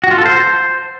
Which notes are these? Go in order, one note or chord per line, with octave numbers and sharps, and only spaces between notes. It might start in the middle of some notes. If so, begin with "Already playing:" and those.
F#4
F4
A4
C5